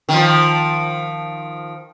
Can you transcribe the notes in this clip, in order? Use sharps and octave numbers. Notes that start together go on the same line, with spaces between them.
D#3 F3